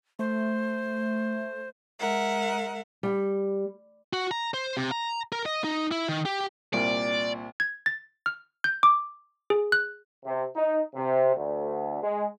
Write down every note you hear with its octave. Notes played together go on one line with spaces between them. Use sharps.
A3 C5
G#3 A#4 E5 F#5
G3
F#4
A#5
C5
C3
A#5
A#4
D#5
D#4
E4
D#3
G4
C2 A#2 A#3 D5
G#6
A6
F6
G6
D6
G#4
F#6
C3
D#4
C3
D2
G#3